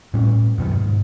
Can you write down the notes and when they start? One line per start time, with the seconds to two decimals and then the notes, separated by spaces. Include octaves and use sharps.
0.13 A2 G3 C#4
0.58 F#2 B2 D#3
0.75 G#2